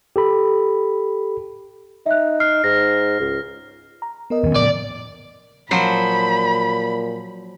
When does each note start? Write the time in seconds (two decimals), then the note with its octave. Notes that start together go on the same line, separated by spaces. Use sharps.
0.16 G4 A4 B5
2.06 D#4 E5 F#6
2.40 F6 C7
2.64 G#2 A#6
3.20 C#2
4.02 A#5
4.30 B3 A#4 D#5
4.43 E2 D#3 C#4
4.55 A2 C#3 F3 D5
5.71 A#2 F3 F#3 C5 B5